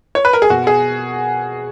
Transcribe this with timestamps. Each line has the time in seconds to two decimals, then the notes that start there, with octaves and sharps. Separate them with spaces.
0.15 C#5
0.25 B4
0.33 A#4
0.42 G#4
0.50 B2 F#4
0.67 G#4